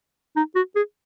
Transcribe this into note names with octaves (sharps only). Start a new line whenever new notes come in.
D#4
F#4
G#4